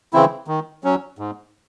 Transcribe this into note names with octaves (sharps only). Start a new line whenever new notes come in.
C#3 E3 C4 E4
D#3
F#3 C#4
G#2